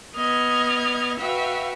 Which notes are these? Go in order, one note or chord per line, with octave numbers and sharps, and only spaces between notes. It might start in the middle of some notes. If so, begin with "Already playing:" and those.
B3 D#5 F6 G#6
F#4 B4 E5 F5 G5